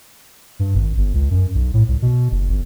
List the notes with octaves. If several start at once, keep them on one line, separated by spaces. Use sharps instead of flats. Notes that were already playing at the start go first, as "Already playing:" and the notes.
G2
G#1
G1
C#2
F#2
B1
A2
C2
B2
F#1
G1